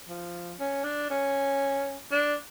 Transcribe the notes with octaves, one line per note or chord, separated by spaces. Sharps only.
F3
C#4
D4
C#4
D4